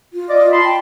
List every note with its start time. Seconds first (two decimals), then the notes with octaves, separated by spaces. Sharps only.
0.13 F4
0.29 D5 D#5
0.52 A5 B5 C6
0.65 G5